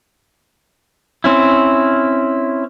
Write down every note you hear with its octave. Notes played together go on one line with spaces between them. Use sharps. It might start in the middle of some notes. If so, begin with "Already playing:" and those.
C4 C#4 E4